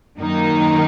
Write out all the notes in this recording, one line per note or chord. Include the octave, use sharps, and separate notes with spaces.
F#2 D#3 A#3 D#4